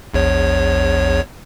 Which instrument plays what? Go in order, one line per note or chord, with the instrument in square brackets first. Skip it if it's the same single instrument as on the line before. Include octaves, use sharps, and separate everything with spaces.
[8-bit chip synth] A#1 E2 C#5